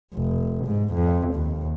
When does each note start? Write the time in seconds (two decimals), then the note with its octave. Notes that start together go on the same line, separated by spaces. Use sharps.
0.14 F1
0.65 G#2
0.94 F2
1.33 D#2